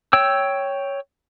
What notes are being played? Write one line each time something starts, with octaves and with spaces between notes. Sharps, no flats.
C#5 G5 E6